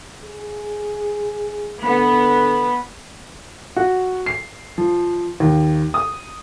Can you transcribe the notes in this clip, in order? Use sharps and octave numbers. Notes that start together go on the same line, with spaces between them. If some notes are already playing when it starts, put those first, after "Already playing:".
G#4
D3 B3
F#4
C7
F3
D#2
D#6